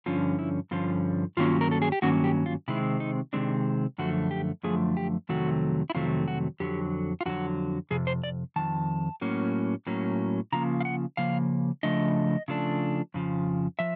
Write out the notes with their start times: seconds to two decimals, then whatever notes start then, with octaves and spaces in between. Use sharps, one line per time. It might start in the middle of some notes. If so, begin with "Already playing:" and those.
0.06 G2 D3 F3 C#4 F4
0.39 E4
0.71 G2 D3 F3 C#4 F4
1.37 G2 D#3 F#3 A#3 C#4 F4
1.61 A#4
1.71 A4
1.82 G#4
1.92 G4
2.02 G2 D#3 F#3 A#3 C#4 F#4
2.24 G4
2.46 F4
2.68 C3 D#3 G#3 C4 E4
3.00 D#4
3.33 C3 D#3 G#3 C4 D4
3.98 F#2 D3 F3 A3 F#4
4.31 G4
4.63 F#2 D3 F3 A3 G#4
4.97 G4
5.29 F2 C3 D#3 F#3 A3 F#4
5.90 E4
5.95 F2 C3 D#3 F#3 A3 F4
6.28 F#4
6.60 F2 D3 F#3 G4
7.21 F4
7.26 F2 D3 F#3 F#4
7.91 F2 C3 G#4
8.07 C5
8.24 D5
8.56 F2 C3 D#3 A5
9.21 A2 F#3 A#3 C#4
9.87 A2 F#3 A#3 C#4
10.52 C#3 F3 A#3 A#5
10.80 F5
10.85 F#5
11.17 C#3 F3 A#3 F5
11.83 C#3 F3 A3 D4 D#5
12.48 C#3 F3 A3 D4
13.14 F2 C#3 F3
13.79 F3 E5